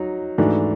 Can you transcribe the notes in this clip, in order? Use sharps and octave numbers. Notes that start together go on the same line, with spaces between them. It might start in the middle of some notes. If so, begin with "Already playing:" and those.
Already playing: F#3 D#4 F#4
G#2 E3 A3 D4 F#4